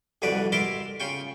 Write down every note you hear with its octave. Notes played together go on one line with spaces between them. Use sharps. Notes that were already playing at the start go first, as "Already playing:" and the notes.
C2 F2 D3 F#4 B4 D5
E4 A#4 E5 A5 C6 D6
C#3 F4 G5 C#6